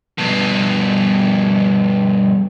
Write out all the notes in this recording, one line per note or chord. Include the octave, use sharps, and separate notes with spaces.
G2 B2